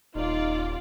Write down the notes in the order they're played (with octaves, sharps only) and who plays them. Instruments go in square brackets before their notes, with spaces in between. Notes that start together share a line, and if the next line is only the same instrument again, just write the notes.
[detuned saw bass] D#1 [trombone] D#4 [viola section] F4 D5